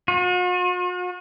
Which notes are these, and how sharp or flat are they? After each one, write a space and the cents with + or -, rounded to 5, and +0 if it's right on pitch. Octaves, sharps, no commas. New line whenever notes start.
F#4 -45